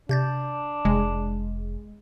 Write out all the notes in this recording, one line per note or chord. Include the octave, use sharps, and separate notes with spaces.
C3 D4 G6 A6
F1 G#3